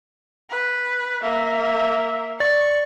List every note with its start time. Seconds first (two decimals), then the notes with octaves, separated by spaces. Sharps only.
0.50 B4
1.22 A#3 E5
2.40 D5 C#6 A6